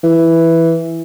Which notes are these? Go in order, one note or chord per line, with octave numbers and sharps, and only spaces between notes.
E3